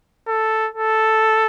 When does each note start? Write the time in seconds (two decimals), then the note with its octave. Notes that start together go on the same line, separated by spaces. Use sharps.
0.28 A4
0.74 A4